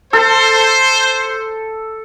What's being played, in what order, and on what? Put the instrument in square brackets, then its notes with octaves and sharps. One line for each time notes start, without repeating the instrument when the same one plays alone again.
[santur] A4 [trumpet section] C5